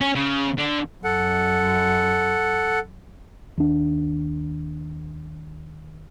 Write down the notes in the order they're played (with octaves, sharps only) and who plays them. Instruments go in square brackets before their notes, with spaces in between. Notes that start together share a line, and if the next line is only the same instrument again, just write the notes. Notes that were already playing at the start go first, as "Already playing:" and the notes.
[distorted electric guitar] C#4
C#3
D3
[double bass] F#2 [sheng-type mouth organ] A4 F#5
[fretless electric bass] D#2 D4